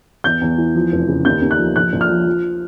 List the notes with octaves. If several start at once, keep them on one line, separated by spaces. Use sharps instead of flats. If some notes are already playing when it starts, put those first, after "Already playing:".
E2 G6
E2
E3
F3
F1
C#3
D#2 G6
D#2
F#6
F3
A#1 F#6
A#1
F6
F3
F3